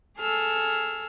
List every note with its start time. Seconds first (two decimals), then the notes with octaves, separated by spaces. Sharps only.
0.18 G#4 A4 E6 F6